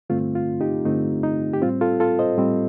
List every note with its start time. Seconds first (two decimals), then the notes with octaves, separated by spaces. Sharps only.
0.10 G2 D3 A3 C4 F4
0.35 F4
0.61 D#4 G4
0.85 G2 D3 A3 C4 D#4
1.23 D#4
1.53 G4
1.62 A2 G3 C4 F4
1.81 F4 A4
2.00 F4 A4
2.19 C5 D#5
2.38 A2 G3 C4